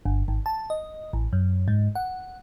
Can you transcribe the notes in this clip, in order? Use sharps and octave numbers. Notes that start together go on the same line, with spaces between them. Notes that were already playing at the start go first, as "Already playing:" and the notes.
G1
G#1
A5
D#5
A1
F#2
G#2
F#5